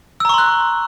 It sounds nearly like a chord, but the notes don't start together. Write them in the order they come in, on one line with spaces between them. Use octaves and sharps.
E6 A#5 C#6 C6 F#6